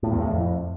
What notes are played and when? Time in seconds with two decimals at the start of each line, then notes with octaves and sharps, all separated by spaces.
0.03 A2
0.12 E2
0.21 A2
0.29 F2